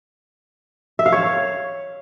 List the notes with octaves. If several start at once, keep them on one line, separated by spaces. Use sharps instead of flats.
E5
F5
C#5